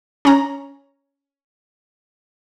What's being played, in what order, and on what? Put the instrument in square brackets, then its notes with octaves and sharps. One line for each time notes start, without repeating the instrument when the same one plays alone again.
[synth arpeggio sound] C#4 A#5